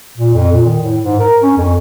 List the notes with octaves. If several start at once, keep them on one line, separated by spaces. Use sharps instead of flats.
A#2
F2
A#2
D#3
A2
G#2
A#4
C#4
F2